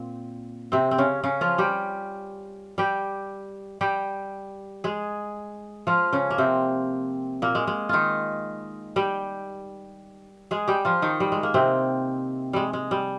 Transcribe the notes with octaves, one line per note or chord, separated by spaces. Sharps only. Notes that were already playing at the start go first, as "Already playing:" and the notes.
Already playing: A#2 C4
C3 C4
C4
C#3 C#4
C#3 C#4
F3 F4
G3 G4
G3 G4
G3 G4
G#3 G#4
F3 F4
C#3 C#4
A#3
C3 C4
A#2 A#3
G#3
G#3
D#3 D#4 F4
G3 G4
G#3 G#4
G3 G4
F3 F4
D#3 D#4
G3
G#3
A#3
C3 C4
G3 G#3
G#3
G3